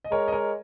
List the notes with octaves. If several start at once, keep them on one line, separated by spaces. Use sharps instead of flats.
D#5
G#3 A#4 C#5
D#5
A#4 C#5